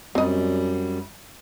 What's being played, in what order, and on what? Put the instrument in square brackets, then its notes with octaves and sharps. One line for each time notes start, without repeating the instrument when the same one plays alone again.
[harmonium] F#2 G3 [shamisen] C4 D#5